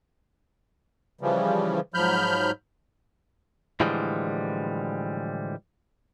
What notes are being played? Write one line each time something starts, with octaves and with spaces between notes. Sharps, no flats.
C#3 E3 F3 G3
G#2 F3 F#3 B5 F6 G6
A2 D3 E3 F3 G3 G#3